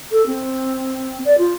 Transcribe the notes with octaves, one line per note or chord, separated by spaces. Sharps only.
A4
C4
D5
F4